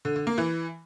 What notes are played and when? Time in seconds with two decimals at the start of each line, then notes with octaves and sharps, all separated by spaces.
0.05 D3
0.16 D3
0.27 A#3
0.38 E3